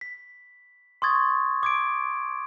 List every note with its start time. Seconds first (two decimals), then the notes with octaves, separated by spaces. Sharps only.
0.01 B6
1.02 C6 C#6 D#6 G#6 A6
1.63 D6 G#6 D7